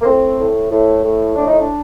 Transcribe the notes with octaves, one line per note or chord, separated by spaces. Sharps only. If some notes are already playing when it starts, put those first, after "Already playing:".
A#3
A2 C4
A2
A2
A2
A2 D4
D#4
D4